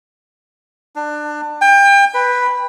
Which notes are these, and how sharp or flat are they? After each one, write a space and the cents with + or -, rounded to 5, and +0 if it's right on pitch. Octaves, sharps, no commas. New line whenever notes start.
D4 +25
G5 +30
B4 +0